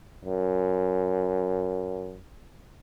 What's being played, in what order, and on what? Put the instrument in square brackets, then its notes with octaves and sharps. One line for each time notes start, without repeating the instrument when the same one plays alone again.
[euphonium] F#2